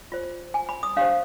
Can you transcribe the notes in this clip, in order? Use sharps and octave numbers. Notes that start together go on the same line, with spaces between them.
F4 C5
G#5
B5
D#6
D4 G4 C5 F5